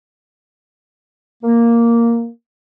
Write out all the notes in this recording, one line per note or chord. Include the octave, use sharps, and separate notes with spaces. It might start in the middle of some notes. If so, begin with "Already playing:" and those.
A#3